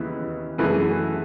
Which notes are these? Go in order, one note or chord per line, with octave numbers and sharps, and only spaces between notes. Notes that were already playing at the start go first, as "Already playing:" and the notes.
Already playing: D#2 C#3 E3 B3 E4
F#2 E3 A3 E4 G#4